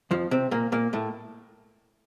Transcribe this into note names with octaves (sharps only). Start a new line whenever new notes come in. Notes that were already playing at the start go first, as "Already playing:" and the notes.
F2 F3
C3 C4
A#2 A#3
A#2 A#3
A2 A3